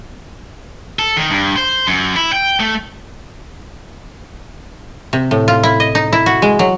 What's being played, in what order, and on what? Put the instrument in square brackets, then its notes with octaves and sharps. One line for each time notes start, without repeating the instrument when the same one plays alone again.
[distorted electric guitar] A4
D#3
G2
C5
F#2
E4
G5
A3
[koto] C3
A2
F4
E4
D#5
D#4
E4
F#4
G#3
F#3